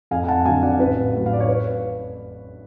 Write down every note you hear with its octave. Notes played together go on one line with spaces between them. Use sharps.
F2 F5 G#5
G#5
F#5 A5
D3 F#3 F5 G#5
D5 F#5
A1 B4
A2 F#3
F5
D5
C#5
B4